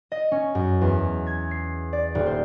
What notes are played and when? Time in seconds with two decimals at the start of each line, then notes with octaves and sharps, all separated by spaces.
0.12 D#5
0.32 C#4
0.55 F#2
0.81 E2
1.27 G#6
1.51 C7
1.93 D5
2.15 D#1
2.26 C5